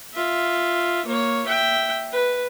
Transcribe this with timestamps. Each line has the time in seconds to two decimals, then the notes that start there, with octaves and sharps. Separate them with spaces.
0.13 F4 E5
1.06 A#3 C#5
1.46 E5 G5
2.13 B4